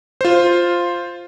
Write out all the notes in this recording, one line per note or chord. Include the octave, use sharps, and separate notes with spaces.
F4 C5